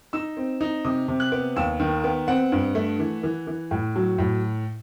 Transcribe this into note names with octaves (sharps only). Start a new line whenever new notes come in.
D#4 E6
C4
D#4
C3 D#6
C3
F#6
B3
D#2 E6
D#3
B3
C4 F#5
G2
A3
E3
E3
E3
A2
F#3
A2